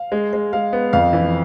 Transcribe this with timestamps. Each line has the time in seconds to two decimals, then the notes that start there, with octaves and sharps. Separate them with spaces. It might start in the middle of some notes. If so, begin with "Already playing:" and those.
Already playing: F5
0.12 G#3
0.33 G#3
0.53 G#3 F5
0.73 B3
0.93 F2 F5
1.13 E3